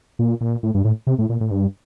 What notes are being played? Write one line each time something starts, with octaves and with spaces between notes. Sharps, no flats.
A#2
A#2
A2
G2
A2
C3
A2
A#2
A2
G2